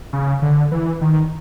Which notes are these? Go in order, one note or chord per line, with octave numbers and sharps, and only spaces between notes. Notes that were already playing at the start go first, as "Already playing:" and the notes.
C#3
D3
E3
D#3